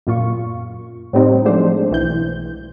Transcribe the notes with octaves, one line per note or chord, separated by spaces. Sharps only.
F#2 A#2 F4 C#6
A2 G3 C4 D#4
F3 F#3 G#3 A3 D4 C5
B1 E3 G6